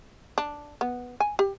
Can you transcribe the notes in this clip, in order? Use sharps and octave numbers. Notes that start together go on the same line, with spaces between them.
D4
B3
G#5
G4